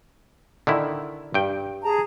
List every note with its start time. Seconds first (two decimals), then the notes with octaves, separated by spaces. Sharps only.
0.67 D3 D#3 E4
1.34 G2 G5
1.82 G#4 A5 A#5